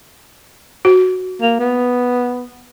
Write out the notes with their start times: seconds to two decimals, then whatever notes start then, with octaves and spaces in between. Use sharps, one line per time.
0.85 F#4
1.42 A#3
1.60 B3